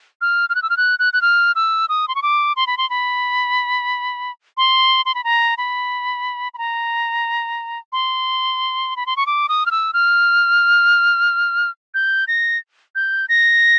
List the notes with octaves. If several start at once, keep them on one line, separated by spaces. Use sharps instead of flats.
F6
F6
F#6
E6
F6
F#6
F#6
F#6
F6
E6
D#6
C6
C#6
D6
C6
B5
C6
B5
C6
C6
B5
A#5
B5
B5
A#5
C6
B5
C6
C#6
D6
D#6
F6
E6
F6
G6
A#6
G6
A#6